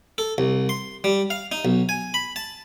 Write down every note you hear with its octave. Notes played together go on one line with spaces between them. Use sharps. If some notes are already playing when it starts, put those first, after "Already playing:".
A4
C2
C6
G3
F5
D#4
B1
G#5
B5
A5